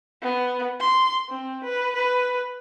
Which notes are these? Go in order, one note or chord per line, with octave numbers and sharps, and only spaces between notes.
B3
C6
C4
B4
B4